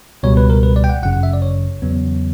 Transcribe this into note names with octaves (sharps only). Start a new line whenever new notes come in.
C#2 B2 G3 C#5
B4
A#4
B4
D5
G5
F#5
G1 F#2 C#3 F#5
F#5
E5
D5
C#5
E2 C#3 F#3 B3